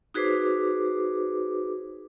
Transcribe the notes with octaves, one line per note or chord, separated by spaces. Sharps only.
D#4 F#4 G#4 B4 C5 D6